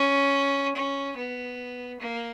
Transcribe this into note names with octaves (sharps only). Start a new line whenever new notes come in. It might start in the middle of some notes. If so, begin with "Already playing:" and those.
Already playing: C#4
C#4
B3
A#3